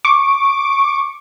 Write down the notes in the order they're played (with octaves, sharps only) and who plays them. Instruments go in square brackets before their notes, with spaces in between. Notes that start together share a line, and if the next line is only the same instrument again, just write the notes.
[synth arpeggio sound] C#6 D6